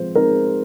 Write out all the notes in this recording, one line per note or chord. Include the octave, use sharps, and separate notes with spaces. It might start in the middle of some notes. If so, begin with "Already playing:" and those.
Already playing: F3 G#3 C4 C5
G#3 C4 D#4 A#4